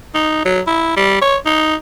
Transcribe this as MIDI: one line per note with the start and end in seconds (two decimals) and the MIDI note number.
0.14 0.43 63
0.45 0.60 54
0.67 0.94 64
0.96 1.20 55
1.21 1.37 73
1.46 1.75 63